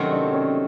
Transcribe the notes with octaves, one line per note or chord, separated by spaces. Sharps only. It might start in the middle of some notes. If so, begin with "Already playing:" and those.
Already playing: C3 D#3 F#3 A3 C4 C#4
D4
C#4